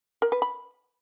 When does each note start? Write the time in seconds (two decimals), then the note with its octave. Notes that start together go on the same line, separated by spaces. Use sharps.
0.22 A#4
0.32 B4
0.42 B5